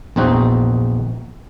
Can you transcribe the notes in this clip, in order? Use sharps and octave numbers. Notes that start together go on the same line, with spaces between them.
A#1 E2 C4 D#4 F#4